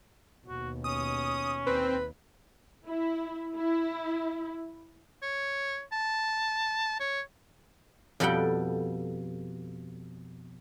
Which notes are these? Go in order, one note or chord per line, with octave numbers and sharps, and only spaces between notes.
D#2 B2 F#4
C#4 D#6
D#2 C4 B4
E4
E4
C#5
A5
C#5
F2 B2 G3 A4 F#5 G5